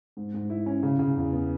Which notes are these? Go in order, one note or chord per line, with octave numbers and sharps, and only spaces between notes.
G#2
G#2
E4
C#4
C#3
C#3
E2
B3